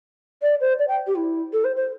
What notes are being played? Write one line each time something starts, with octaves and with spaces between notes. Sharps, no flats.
D5
C5
D5
G5
G4
E4
A4
C5
C5